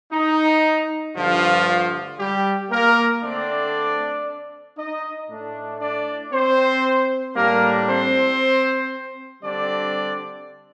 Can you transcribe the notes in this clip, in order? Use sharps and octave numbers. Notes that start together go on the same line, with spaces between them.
D#4
G2 D3 F3 A3 F4
G3 G4
A#3 A#4
D3 A3 C4 D4 D5
D#4 D#5
A2 A3 D4
D4 D5
C4 C5
A2 G3 A#3 D4 A#4
C4 C5
D3 G3 C4 D4 D5